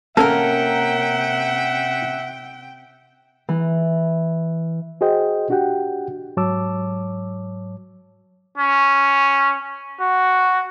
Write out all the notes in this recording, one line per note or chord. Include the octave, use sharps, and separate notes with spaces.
C3 A#3 C#4 A4 A#4 E5 F#5 G5
E3
F#4 G#4 C5 D#5 G5
D4 F#4 G4 F#5 G5
G#2 F#3 C#5 A5 D6 E6
C#4
F#4